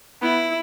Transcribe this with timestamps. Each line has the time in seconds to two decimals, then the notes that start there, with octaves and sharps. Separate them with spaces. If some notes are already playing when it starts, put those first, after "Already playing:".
0.22 B3 E4